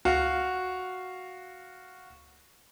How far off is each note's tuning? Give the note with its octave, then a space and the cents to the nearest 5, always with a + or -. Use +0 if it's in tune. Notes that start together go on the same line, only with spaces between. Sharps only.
F#4 -5 F5 +0